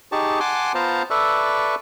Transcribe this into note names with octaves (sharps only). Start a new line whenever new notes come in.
D#4 G4 G#4 A5 C#6
F#5 G#5 A5 C6 D6
B3 F4 C5 A5 A#5
A4 B4 D5 E5 C#6